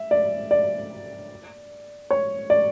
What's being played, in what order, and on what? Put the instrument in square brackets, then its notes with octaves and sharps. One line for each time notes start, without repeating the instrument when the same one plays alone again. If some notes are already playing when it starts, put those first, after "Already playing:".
Already playing: [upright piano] E5
D5
D5
C#5
D5